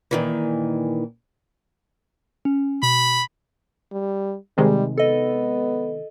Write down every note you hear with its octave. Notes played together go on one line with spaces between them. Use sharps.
A#2 D#3 E3
C#4
B2 B5
G3
C3 D#3 G3 G#3
B3 A4 D#5